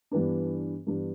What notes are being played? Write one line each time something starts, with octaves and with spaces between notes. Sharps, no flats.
G2 E3 B3 D4
G2 E3 B3 D4